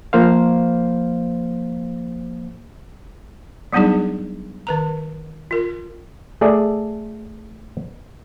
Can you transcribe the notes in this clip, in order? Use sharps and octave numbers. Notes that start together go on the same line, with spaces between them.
F3 A#3 C5 F5
F#3 G3 B3 D4 D#4 G#4
D#3 B4 A#5
F4 A#4
A3 G#4 A4 D5